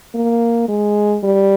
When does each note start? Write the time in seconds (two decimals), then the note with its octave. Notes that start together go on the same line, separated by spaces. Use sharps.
0.15 A#3
0.69 G#3
1.24 G3